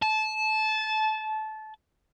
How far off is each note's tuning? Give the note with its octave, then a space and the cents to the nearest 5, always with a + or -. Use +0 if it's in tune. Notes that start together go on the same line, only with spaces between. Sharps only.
A5 -20